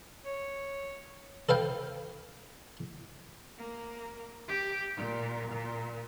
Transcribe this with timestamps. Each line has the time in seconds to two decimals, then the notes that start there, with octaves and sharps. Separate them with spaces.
0.25 C#5
1.49 A4 B4 F5 G5
3.58 A#3
4.48 G4
4.96 A#2
5.51 A#2